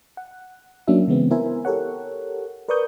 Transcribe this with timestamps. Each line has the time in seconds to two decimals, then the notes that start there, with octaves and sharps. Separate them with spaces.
0.17 F#5
0.87 F#3 A#3 C#4 D4 F#4 E5
1.08 C#3 E3 G#3 B3 C4
1.31 B3 E4 A#4 C5 E5 G#5
1.65 G4 A4 A#4 C#5 F#5
2.68 A#4 B4 D5 C#6 D#6 G6